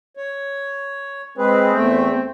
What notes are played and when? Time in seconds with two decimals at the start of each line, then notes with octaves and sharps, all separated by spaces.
0.17 C#5
1.38 G#3 C4 G#4 B4
1.73 E2 A3 G5